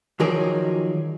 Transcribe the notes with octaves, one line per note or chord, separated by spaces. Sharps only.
D#3 F3 F#3 G#4 A#4 D5